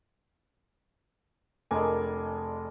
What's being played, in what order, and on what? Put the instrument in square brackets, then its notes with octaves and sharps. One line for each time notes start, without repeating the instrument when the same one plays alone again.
[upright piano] F1 G#5 [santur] G#3 D4 [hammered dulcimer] A#4